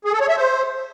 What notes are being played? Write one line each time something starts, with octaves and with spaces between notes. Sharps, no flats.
G#4
A4
C#5
E5
C5